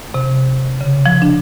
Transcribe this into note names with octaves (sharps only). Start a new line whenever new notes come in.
C3
C#3
F3
D4